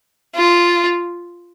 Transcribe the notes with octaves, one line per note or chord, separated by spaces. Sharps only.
F4